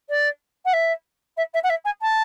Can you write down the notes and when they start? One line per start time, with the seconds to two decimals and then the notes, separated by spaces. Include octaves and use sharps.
0.09 D5
0.65 F#5
0.73 E5
1.37 E5
1.54 E5
1.63 F#5
1.69 E5
1.85 G#5
2.01 A5